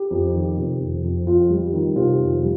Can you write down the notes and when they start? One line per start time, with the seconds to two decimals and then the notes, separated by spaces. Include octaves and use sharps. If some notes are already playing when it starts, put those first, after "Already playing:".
Already playing: G4
0.11 F2
0.34 D#3
0.57 C3
0.80 F2
1.04 F2
1.26 F2 F4
1.50 G3
1.73 D#3
1.96 C3 F4
2.18 F2
2.42 G3